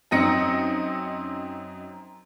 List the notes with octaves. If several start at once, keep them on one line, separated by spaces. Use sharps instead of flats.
F#2 C4 D#4 A#6 C#7